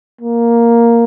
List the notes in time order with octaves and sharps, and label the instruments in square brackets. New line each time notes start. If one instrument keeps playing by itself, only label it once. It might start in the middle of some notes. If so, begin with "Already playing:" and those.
[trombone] A#3